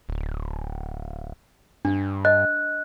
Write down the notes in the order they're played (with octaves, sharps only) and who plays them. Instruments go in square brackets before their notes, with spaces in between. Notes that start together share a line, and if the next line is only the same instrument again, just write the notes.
[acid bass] D1
[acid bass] G2 [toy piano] D4
[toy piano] D#5 [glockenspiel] F#6